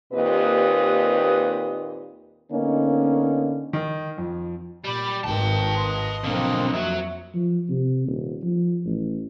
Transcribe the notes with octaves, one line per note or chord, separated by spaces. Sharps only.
D#2 A#2 C4 G4 B4 D#5
D3 A#3 B3 C#4 D#4
D#3
F2
A#2 G3 D5 B5
G#1 D#3 B4 G5 A5
D#5 C6
B1 D3 F3 A#3 C4
F2 F#3 F#4 E5
F3
C3
D#1
F3
A1